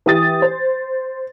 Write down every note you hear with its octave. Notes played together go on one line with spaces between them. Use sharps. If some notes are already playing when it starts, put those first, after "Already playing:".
E3 G4 D#6 A6
C5